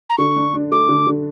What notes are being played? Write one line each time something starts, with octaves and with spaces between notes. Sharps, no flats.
A#5
D3 C#6
D4
D4
A3 D6
D3
D3